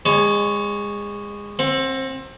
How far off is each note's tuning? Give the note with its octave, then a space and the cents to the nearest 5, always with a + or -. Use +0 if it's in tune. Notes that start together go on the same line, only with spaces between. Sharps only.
G#3 -25 C#5 +0 G#5 +45
C4 +25 F#5 -15